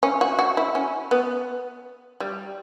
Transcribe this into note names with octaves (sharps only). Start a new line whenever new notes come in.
C#4
F#4
F#4
E4
C#4
B3
G3